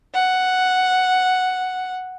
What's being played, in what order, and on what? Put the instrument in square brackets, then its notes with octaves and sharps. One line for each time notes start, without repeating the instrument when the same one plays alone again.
[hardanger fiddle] F#5